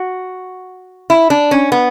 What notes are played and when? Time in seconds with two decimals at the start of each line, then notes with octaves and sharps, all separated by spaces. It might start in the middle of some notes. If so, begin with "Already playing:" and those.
Already playing: F#4
1.10 E4
1.30 D4
1.51 C#4
1.72 B3